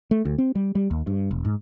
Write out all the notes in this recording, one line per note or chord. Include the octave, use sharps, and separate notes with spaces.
A3
D2
C4
G3
G3
D#2
G2
E1
G#2